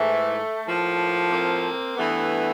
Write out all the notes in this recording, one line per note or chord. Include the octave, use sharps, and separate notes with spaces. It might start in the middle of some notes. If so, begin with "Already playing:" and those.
Already playing: G#2 E3 A3
A2 F3 A#3
A#3 C4
G2 E3 A3 B3